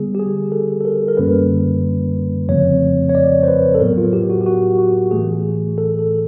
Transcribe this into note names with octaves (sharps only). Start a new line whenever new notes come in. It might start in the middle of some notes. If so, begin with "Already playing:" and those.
Already playing: D3 G3 B3 G#4
G4
G#4
A4
A4
A#4
A#4
F#2 D3 G3 A#3 C#4 B4
F2 C#3 F3 A3 C4 C#5
C#5
D5
C5
B4
A4
A2 F#3 B3 A#4
F4
G4
F#4
G4
F#4
F#4
A2 E3 A3 G#4
A4
A4